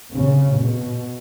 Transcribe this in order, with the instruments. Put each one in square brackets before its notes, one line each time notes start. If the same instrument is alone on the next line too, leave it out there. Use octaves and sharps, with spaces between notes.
[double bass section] C#3
B2